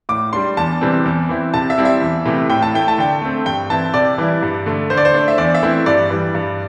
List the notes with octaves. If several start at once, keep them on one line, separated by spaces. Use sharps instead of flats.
A2 D6
G3 D4 C6
E2 A5
C3 E3 G3 C4
E2
E3 C4 E4
C3 A5
E5
G3 C4 E4
E5
E2
C3 E3 A3 E4
A2 G5
A5
A3 E4 G5
A5
D3 G5
A3 C4
G2 G5
E3 C4 E4 A5
C3 D5
E3 G3 E4
G2
D3 A3
D3 C5
D5
C5
A3 D4
E5
E2 D5
E5
E3 A3 C4 E4
G2 D5
E3 G3
G2